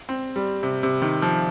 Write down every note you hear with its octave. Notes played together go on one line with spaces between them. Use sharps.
C4
G3
C3
C3
D#3
F3